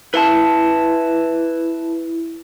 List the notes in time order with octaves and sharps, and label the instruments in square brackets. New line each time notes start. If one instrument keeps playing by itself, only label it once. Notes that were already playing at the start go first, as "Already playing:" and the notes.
[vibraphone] E4 [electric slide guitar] B4 E5 A5